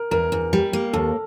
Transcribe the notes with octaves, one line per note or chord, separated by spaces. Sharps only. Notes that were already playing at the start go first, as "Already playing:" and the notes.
Already playing: A#4
E2 A#4
E2
G3
A#3
D#2 A4